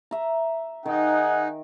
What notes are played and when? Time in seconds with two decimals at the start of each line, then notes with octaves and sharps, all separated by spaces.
0.11 E5 A#5
0.85 D#3 D#4 G#4 F#5